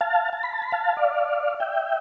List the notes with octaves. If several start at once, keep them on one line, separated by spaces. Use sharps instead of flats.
F5 A5
A5
B5
A5
B5
F5 A5
D5 F5
E5 G5